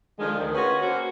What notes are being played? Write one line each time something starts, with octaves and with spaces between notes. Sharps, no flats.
D3 D#3 F3 G#3
D2 D#3
C#4 F4 F#4 G#4 B4
A#3 C4 C#4 F#4